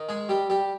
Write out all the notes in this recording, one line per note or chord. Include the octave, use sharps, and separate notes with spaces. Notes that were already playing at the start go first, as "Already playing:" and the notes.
Already playing: D#3
G#3 G#4
G3 G4
G3 G4